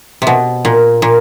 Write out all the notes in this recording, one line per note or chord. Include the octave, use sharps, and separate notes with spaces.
C3
B2
A#2
A#2